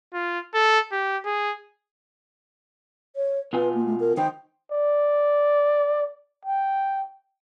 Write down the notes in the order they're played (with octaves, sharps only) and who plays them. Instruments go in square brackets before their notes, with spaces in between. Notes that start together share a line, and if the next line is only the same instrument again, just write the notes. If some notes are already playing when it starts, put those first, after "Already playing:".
[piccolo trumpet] F4
A4
G4
G#4
[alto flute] C#5
[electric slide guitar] B2 F4 G#5 [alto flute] B4
[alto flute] A#3
A3
A#4
[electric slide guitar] D#3 D#4 C5 [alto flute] G5
[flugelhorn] D5
G5